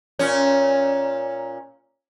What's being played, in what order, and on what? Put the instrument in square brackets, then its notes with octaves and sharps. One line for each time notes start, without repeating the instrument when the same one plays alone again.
[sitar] A#2 C#4